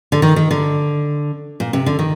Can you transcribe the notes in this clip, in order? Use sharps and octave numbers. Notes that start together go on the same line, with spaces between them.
D3
D#3
D#3
D3
A#2
C3
D3
D#3